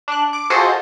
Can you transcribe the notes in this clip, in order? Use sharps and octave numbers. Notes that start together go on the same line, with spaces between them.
D4 F#6
D6
F4 F#4 G#4 A4 C5 D#5